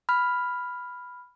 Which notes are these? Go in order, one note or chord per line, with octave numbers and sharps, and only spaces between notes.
B5 F6